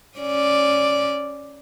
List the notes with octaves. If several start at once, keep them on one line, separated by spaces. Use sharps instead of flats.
C#4 D5